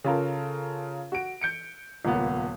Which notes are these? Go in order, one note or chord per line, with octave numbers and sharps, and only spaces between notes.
C#3 F4 A4 A#4
F#4 D7
G6 C#7 D7
D#1 C#2 A#3 B3